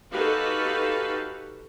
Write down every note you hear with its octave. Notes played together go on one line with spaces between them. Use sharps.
D#4 F#4 G4 A4 B4 F5